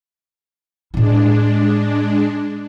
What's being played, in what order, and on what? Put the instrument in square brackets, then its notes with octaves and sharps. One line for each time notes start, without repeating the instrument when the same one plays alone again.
[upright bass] A2 E4 [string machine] G#3 D4